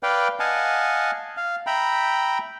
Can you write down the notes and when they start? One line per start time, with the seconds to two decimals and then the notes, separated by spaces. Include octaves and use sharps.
0.03 B4 D5 F5 G5
0.40 D#5 F5 F#5 G#5 A5
1.37 F5
1.67 E5 G5 A#5 B5